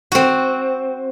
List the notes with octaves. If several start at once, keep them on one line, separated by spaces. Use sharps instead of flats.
C4 F#4